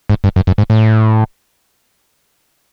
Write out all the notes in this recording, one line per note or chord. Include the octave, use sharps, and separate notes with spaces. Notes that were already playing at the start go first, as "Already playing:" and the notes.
G#2
G2
F#2
F#2
G#2
A2